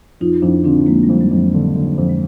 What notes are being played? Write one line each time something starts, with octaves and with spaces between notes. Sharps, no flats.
F2 D#4 F4
F2 D4 E4
D3 C4 D4
F2 G#3 A#3
G3
F2
F#3 G#3
F2
F#3
D3
D3
F2
G#3